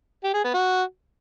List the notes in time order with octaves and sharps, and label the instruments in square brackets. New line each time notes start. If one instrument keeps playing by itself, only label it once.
[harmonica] G4
G#4
B3
F#4